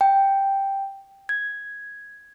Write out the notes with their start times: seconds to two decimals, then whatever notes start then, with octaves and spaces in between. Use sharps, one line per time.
0.01 G5
1.29 G#6